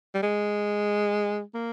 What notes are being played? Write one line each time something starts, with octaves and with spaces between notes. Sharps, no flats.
G3
G#3
A#3